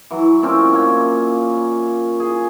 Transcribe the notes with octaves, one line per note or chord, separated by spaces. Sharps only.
E3 F#3
A#2 C4 C#4 D6
A#3 C#5
G#4